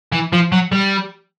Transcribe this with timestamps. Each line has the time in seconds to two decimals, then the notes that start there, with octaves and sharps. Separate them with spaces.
0.12 E3
0.33 F3
0.52 F#3
0.72 G3